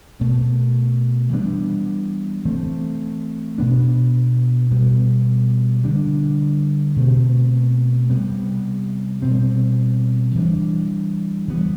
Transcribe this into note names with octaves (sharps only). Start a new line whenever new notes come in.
B2 A3 C4
E3 G3 B3 D4
E3 A3 C4
B2 B3 D4
B2 G3 B3
D3 G3 D4
B2 A3 C4
C3 G3 B3
B2 G3 C4
E3 G3 D4
E3 G3 B3